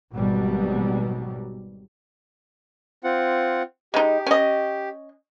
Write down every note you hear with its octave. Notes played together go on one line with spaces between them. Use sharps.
G#1 B2 F#3 G3
C4 F4 F#5
G#3 D#4 G4
C#4 D#5